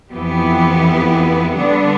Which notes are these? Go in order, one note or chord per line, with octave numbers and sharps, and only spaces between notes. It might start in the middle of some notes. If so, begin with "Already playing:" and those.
F2 E3 B3 E4 G4
D3 G3 B3 D4